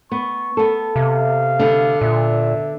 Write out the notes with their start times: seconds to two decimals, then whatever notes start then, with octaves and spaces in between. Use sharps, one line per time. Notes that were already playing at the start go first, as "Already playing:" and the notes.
0.12 B3 C#6
0.57 B3 A4
0.96 C3 F5
1.59 D3 B3
2.01 A#2 E5